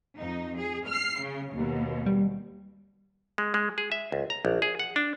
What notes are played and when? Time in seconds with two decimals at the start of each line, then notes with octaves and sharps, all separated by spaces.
0.17 F2 D#4
0.58 G#4
0.88 F6 C7
1.20 C#3
1.54 D#2 B2
2.06 G3
3.38 G#3
3.54 G#3
3.78 G#4
3.92 E5
4.12 C#2
4.30 A#5
4.45 A#1
4.62 G#4
4.79 F#5
4.96 D4